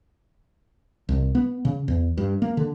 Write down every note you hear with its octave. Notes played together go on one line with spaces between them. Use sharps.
C2
B3
C#3
E2
G2
A#3
D3